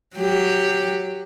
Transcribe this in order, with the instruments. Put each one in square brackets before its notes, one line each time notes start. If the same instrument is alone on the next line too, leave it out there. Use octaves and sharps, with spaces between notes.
[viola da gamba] F#3 G4